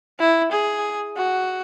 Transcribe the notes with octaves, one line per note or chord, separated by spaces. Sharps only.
E4
G#4
F#4